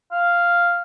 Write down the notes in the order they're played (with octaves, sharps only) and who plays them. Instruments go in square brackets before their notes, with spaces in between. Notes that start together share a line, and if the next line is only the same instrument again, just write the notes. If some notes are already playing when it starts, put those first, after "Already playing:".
[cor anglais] F5